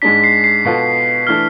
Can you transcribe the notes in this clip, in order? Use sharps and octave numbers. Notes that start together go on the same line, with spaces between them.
G#2 G#3 D4 B6
C7
C7
B2 B3 F4 A4
E3 A3 D4 A4 F6